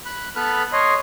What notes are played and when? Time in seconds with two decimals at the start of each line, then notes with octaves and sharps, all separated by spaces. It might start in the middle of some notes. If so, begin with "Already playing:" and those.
0.06 B5 F#6
0.36 B3 A4 B4 B5 F6 F#6
0.73 C#5 D#5 C6